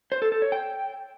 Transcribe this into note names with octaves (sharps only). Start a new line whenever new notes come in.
C5
A4
A4
C#5
G5